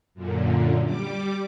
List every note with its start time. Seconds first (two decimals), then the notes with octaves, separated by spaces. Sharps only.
0.14 F#2 A#2 D3
0.85 G3 D6